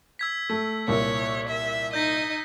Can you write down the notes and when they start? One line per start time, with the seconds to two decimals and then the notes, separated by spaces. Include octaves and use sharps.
0.19 E6 G#6 B6
0.49 A3
0.88 C2 A#2 C#5
1.48 E5
1.93 D#4 D#5 G6 A#6 B6